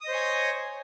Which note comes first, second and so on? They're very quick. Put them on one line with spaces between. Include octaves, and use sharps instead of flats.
D#6 D#5 C5 C#5 G#5